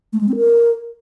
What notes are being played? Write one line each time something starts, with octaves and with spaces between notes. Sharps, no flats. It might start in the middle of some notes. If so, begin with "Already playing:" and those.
A3
G#3
C4
A#4